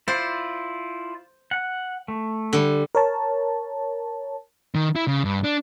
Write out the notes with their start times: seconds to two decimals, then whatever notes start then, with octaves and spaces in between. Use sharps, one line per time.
0.08 E4 F4 C5 D5
1.51 F#5
2.08 A3
2.53 D3 G3
2.95 A#4 C#5 A5
4.75 D#3
4.96 E4
5.08 C#3
5.24 G2
5.44 D4